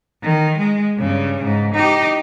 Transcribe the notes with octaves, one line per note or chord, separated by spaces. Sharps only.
D#3
G#3
G2 C#3
G#2
D#4 G4